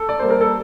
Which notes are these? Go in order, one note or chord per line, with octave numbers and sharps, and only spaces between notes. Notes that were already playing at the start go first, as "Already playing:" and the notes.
Already playing: A4
D5
G3 A#3 C5
A#4
A4